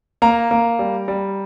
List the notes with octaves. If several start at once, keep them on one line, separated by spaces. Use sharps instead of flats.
A#3 A#5
A#3
G3
G3